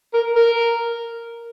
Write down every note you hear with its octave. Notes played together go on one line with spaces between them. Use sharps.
A#4
A#4